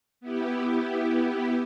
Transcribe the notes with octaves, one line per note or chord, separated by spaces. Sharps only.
B3 E4 G4